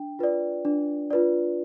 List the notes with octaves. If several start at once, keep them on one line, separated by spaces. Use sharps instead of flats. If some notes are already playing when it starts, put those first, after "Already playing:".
Already playing: D4 G5
F4 B4 D5
D4
F4 B4 D5